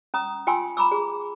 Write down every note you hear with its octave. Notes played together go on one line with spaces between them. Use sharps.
C#4 A#5 D#6
F4 G5 G#5 C6 E6
A#5 B5 C#6 D6 E6
G#4